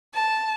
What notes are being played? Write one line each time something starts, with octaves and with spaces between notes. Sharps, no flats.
A5